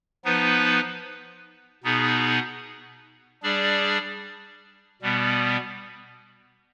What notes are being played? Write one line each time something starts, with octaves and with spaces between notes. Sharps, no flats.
F3 B3 D#4 B4
B2 B3 D#4 G#4
G3 D4 G#4 D5
B2 G3 B3